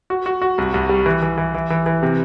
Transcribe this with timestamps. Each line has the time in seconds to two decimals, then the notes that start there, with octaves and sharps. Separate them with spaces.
0.10 F#4
0.26 F#4
0.42 F#4
0.58 C2
0.74 C2
0.89 G3
1.06 E3
1.22 E3
1.38 E3
1.54 E3
1.70 E3
1.86 E3
2.03 C3